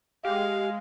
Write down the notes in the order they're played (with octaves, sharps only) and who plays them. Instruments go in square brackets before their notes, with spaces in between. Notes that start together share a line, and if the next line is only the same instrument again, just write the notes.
[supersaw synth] G#3 [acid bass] G4 [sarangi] F5